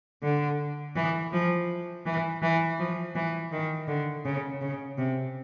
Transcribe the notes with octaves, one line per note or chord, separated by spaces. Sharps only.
D3
E3
F3
E3
E3
F3
E3
D#3
D3
C#3
C#3
C3